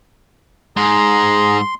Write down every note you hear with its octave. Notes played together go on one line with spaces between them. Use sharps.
G#2 G#4 A#5 C6